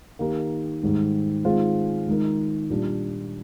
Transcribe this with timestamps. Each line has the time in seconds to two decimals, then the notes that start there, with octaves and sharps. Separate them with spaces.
0.19 D#3 A#3 D#4 G4 A#4
0.82 G#2 D#3 G3
1.44 D#3 G#3 C4 F4 G#4
2.07 D#3 G#3 D#4 A#4
2.70 A#2 G3 D4